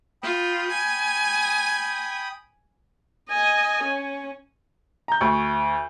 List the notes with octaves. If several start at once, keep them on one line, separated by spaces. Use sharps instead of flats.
F4 G5 B5 D#6
G#5
D#5 G#5
C#4
A#5 G6
D2 C#6